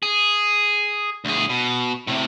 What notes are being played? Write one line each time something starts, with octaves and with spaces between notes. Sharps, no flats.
G#4
D2 G#4
B2
A2 C3